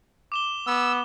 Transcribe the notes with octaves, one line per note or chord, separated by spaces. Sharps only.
D6 E7 G7
B3 E6